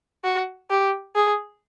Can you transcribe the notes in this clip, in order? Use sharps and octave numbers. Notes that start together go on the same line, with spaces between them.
F#4
G4
G#4